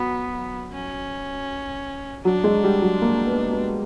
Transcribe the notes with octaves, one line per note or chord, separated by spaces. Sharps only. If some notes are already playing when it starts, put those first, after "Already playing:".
Already playing: F#3 B3
C#4
F#3 D4
G#3
G3
F#3
A#3
B3
B3